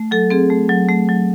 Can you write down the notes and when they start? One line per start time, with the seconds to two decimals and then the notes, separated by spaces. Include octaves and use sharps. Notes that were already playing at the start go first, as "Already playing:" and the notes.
Already playing: A3
0.11 F#3 A4
0.30 C4 G#4
0.50 A3
0.69 F#3
0.89 A3
1.09 F#3